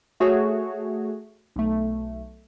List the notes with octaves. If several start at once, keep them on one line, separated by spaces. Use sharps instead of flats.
A3 F#4 G#4 C#5
B1 A3